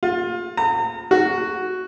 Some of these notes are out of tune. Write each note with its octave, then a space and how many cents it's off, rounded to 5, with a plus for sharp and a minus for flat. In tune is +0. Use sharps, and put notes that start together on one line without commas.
F4 +25
A#5 -35
F#4 +5